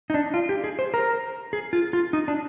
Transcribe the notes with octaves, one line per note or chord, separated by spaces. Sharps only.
D#4
D4
F4
G4
G#4
C5
A#4
G#4
F4
F4
D#4
D4